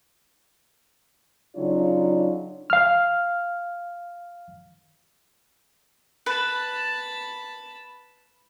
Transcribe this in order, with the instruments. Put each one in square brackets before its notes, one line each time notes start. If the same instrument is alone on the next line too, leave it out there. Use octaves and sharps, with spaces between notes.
[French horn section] C#3 F#3 D4 D#4 F4 C#5
[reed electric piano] F5 F6
[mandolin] B4 [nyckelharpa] A5 B5